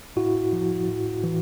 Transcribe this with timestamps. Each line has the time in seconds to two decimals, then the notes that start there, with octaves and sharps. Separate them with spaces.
0.16 A2 E4 F#4
0.53 F3
0.88 A2
1.24 E3